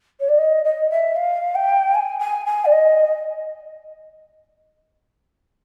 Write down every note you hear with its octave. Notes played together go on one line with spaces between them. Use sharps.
C#5
D5
D#5
D#5
E5
F5
G5
G#5
G#5
G#5
D5
D#5